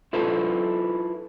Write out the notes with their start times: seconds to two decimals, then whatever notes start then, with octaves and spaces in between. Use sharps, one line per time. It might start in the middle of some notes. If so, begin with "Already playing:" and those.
0.13 E4 F4 A4 B4 A5